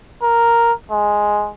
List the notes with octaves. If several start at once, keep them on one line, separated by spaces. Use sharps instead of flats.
A#4
G#3